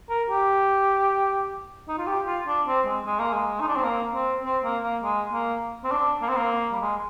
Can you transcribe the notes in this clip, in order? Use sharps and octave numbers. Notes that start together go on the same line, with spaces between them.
A#4
G4
D#4
F4
G4
F4
D4
C4
G#3
G#3
A#3
G#3
D#4
D4
C4
A#3
C4
C4
A#3
A#3
G#3
A#3
C4
D4
A#3
C4
A#3
G3
G#3